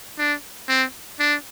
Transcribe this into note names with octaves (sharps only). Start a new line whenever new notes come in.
D4
C4
D4